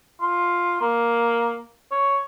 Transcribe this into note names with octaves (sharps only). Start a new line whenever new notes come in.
F4
A#3
C#5